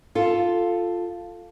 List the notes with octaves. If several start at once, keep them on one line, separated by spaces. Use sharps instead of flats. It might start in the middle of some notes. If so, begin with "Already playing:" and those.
F4 A4